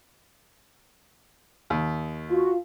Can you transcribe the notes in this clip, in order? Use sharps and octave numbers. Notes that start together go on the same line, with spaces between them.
D#2
F4 F#4